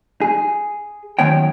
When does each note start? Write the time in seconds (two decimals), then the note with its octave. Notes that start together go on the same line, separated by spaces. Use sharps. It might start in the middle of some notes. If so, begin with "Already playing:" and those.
0.21 G#4
1.19 F#2 D#3 B3 C#5 G5